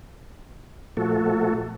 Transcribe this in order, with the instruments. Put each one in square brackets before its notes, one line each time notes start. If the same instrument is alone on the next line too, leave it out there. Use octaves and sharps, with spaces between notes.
[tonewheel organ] A#2 F3 A3 F#4 A4